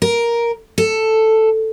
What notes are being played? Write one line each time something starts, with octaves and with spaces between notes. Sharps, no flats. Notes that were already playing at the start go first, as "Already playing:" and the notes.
A#4
A4